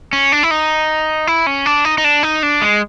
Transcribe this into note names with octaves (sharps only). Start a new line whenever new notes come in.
C#4
D4
E4
D#4
E4
C#4
D4
D#4
D#4
D4
D#4
D4
G#3